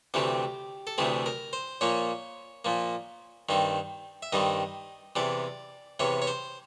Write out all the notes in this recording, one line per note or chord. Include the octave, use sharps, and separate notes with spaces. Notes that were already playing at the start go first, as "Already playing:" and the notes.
D2 C3 E3 A3 C4 G4
A4
D2 C3 E3 A3 C4 G#4
A#4
C5
A#2 F3 A#3 C#5
A#2 F3 A#3
G2 D#3 G3 C4
E5
G2 D#3 G3 C4 D#5
E2 C3 E3 D5
E2 C3 E3 C#5
C#5
C5